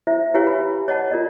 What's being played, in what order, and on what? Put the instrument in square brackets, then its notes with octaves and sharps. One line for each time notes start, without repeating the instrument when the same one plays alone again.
[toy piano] E4 C5 E5
E4 G4 B4 C#5 F5 G#5
B5
C#5 D#5 F#5 A5
F4 A#4 D5 D#5